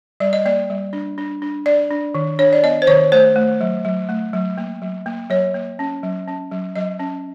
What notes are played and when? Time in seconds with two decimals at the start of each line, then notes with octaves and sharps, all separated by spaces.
0.20 G3 D5
0.33 D#5
0.46 A#3 D5
0.70 G3
0.93 D4
1.18 D4
1.42 D4
1.66 D4 D5
1.91 D4
2.15 D#3
2.39 D4 C#5
2.53 D5
2.63 B3 D#5
2.82 C5
2.87 D#3 C#5
3.12 A3 C5
3.36 A3
3.61 F#3
3.85 F#3
4.09 A3
4.33 F#3
4.58 A#3
4.82 F#3
5.06 A#3
5.30 F#3 C#5
5.54 A#3
5.79 C#4
6.03 F#3
6.28 C#4
6.51 F#3
6.76 F#3 D#5
6.99 C#4